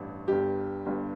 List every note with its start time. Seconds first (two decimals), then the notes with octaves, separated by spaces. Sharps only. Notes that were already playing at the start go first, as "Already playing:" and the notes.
Already playing: A1 G2
0.27 G1 G2 G3 G4
0.86 G1 G2 G3